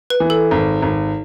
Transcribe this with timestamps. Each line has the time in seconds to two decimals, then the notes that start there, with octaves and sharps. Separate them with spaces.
0.10 B4
0.20 E3
0.30 A4
0.51 G#1
0.82 G#1